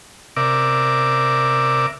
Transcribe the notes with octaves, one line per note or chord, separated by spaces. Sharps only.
C3 A#4 D5 E5 D6